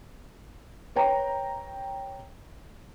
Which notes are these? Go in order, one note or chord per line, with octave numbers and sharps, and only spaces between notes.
B4 C#5 G5 A#5